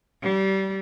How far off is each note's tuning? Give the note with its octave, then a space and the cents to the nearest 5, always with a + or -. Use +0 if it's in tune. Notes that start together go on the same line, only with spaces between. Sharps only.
G3 -25